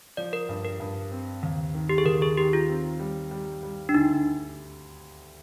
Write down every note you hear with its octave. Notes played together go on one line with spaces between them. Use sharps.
F3 D5
A#4
G2
A#4
G2
C4
D#2
D#3
G4
G#4
D#2 A#4
G#4
D#3 G4
F4
C4
G3
G3
G3
D4
D2 D#4